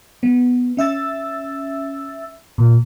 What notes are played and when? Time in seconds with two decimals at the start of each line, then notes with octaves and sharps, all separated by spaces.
0.23 B3
0.77 C#4 E5 E6 A6
2.58 A#2